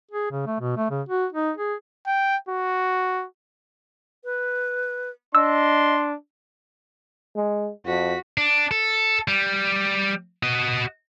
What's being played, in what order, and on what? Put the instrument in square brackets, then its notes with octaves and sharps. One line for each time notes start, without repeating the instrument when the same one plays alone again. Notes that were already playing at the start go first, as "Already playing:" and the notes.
[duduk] G#4
C#3
A3
B2
A3
C#3
F#4
D#4
G#4
[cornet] G5
F#4
[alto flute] B4
[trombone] D4 [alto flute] D#5 [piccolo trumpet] C6 [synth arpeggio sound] E6
[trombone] G#3
[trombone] F2 [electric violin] F#4 B6
[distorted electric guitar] D4
A4
G3
F#4 D#5